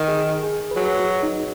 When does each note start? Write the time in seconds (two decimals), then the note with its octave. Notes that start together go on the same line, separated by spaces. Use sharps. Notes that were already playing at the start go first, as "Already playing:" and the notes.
Already playing: D#3
0.08 G#4
0.43 G#4
0.71 B4
0.76 F#3 G#4
1.00 F#4
1.23 D#4